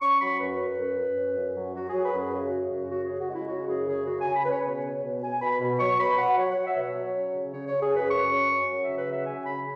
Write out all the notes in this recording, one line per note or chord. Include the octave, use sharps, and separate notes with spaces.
C#4 C#6
F#3 B5
F#2 B4
F#2
F#2
F#2
C#4
F#2
F#3
F#3 F#4
G#4
F#3
B4
F#2 G#4
C#3 F#4
C#3 F#4
F#2 F#4
C#3 F#4
C#3 G#4
F#4
G#3
E4
C#3 F#4
F#2 G#4
C#3 G#4
C#3 F#4
C#3 G#5
B5
C#3 B4
C#5
B2 C#5
C#4
B2
B2 G#5
B2 B5
B2
F#3 C#6
B2 B5
F#3 F#5
F#3 C#5
F#3 F#5
E5
B2
C#5
F#3
C#4
C#3
C#3 C#5
C#3 C#5
G#4
F#2 B4
F#2 C#6
C#4
C#4
F#3
C#3 E5
B4
F#3 E5
C#3 G#5
C#3 B5